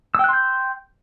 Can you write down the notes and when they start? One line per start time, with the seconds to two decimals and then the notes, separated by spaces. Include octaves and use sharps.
0.15 E6
0.19 G5
0.24 F#6
0.29 C6
0.33 G6